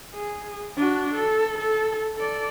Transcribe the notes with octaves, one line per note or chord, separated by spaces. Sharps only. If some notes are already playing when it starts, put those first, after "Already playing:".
G#4
D4 F#4
A4
A4
A4 D5